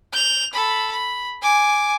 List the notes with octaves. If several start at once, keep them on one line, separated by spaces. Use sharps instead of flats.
G6 F7
A4 B5
B5
G#5 D6